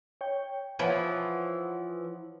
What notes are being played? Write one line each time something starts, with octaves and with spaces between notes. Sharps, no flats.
C#5 G5
E3 F3 B4 C#5 F#5